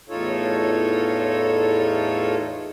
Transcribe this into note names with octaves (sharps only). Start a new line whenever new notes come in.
E2 A2 D#4 F4 A4 C#5